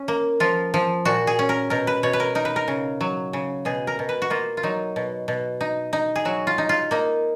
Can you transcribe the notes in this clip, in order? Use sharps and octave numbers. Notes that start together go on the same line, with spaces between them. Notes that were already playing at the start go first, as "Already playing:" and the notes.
Already playing: C#4
A#3
F3 F4
F3
A#2 F#4
G#4
C#4
A#4
B2 A#4
B4
B2 C#5
B4
A#4
D#4 A#4
B4
A#4
C#3
F#3
C#3
B2 G#4
A#4
B2
B4
F#4
A#3 F4
F4
F#3 D#4
B2
B2
D#4
D#4
G#4
F#3 F#4
F4
D#4
F4
A#3 D#4